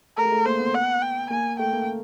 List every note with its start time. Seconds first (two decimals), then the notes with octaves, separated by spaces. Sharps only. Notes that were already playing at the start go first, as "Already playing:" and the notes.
0.17 A3 A#4
0.25 G#3
0.32 A3
0.46 A#3 C5
0.59 B3
0.74 F#5
1.02 G5
1.30 A#3 G#5
1.59 A3 G5
1.73 A#3